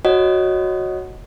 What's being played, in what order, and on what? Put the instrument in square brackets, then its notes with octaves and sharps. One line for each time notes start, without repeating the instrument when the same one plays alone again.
[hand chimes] F#4 C#5 D#5 F#5